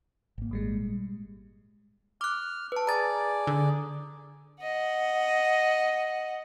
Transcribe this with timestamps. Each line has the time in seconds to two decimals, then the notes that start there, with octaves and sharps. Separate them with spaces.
0.38 G#1 A#3
0.51 A#2 G3 G#3
2.21 D6 F6 F#6
2.72 B4 A5
2.87 G#4 D5 A#5 A6
3.47 D3
4.62 D#5 F#5